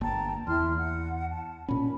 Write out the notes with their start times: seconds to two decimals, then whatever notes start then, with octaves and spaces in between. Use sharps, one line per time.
0.01 G1 A#3 G5 A5 A#5
0.47 E2 E4 C6 F6
0.78 F#5
1.31 A5
1.68 A#2 C#4 B5